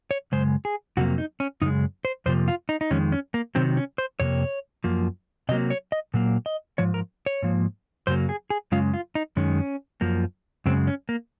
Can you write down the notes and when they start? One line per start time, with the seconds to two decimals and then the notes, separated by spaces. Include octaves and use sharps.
0.11 C#5
0.32 F#2 C#3 G#3 C5
0.65 G#4
0.97 F2 C3 F#3 A#3 F#4
1.18 D#4
1.40 C#4
1.61 F#2 C#3 G#3 D#4
2.05 C5
2.26 F2 C3 F3 A#3 C5
2.48 F4
2.69 D#4
2.81 D#4
2.91 F2 D#3 G#3 C#4
3.12 C#4
3.34 A#3
3.55 C3 D#3 F#3 C4
3.77 C#4
3.98 C5
4.20 F2 C3 A#3 C#5
4.84 F#2 F3 A#3
5.49 C3 F#3 A#3 D#5
5.70 C#5
5.92 D#5
6.14 A#2 F#3 A#3
6.46 D#5
6.78 G#2 F3 C#5
6.94 A#4
7.26 C#5
7.42 G#2 F3 A#3
8.07 F#2 C#3 F#3 A#3 C5
8.29 G#4
8.50 G#4
8.72 F#2 C#3 G#3 F4
8.94 F4
9.15 D#4
9.36 F#2 D#3 G#3 C#4
10.01 F#2 F3 A#3
10.66 F#2 C#3 G#3 C4
10.87 C#4
11.09 A#3